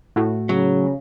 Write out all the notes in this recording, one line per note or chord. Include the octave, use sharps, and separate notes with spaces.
A2 A3 F#4
C#3 F#3